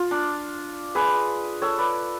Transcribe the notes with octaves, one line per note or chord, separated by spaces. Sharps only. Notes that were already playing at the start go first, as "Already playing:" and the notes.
Already playing: F4
D4
G#4 B4
A4 C#5
B4 D5